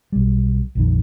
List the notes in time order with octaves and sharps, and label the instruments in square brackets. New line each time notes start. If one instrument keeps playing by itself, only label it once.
[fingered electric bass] B1 G3
A#1 F2 D#3